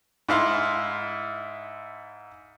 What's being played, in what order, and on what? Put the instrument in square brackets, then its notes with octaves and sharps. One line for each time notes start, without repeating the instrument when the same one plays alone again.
[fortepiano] G#2 E4 F5 C6